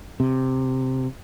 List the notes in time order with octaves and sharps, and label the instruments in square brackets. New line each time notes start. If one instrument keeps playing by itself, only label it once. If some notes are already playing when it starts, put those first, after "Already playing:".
[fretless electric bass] C3